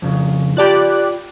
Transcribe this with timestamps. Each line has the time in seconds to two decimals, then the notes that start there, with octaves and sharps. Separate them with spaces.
0.02 F2 C#3
0.57 F4 G4 D5 A5 B5 F#6